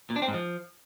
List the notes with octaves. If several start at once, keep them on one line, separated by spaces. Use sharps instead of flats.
A#2
D4
C4
G#2
F3